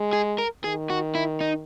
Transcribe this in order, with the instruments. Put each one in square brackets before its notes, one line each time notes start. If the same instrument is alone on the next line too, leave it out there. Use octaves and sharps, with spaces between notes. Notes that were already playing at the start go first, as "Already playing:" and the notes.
Already playing: [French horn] G#3
[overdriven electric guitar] G#4
A#4
[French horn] D#3 [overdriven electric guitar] G#4
[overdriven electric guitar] F#4
E4
D#4